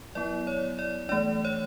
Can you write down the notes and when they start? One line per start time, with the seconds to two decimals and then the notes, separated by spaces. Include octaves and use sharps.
0.15 F#3 B3 E4 D5
0.47 C#5
0.79 D5
1.09 E3 A3 D4 D5
1.45 C#5